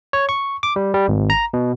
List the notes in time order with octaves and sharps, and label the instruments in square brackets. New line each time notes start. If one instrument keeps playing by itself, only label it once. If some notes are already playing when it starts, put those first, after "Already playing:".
[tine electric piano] C#5
C#6
D6
G3
G3
G#1
A#5
B2